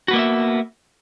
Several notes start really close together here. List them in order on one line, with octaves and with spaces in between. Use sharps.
F#4 B3 A#3 D#5 E5